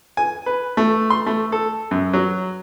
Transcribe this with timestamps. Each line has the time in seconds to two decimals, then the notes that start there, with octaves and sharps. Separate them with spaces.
0.17 G#5
0.46 B4
0.77 A3
1.10 C6
1.26 A3
1.52 A4
1.91 F#2
2.13 F#3